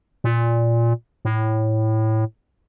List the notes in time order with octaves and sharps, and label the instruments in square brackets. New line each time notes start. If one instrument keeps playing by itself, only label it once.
[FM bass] A#2
A2